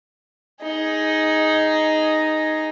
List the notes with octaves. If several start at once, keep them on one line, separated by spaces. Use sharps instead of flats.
D#4 G#4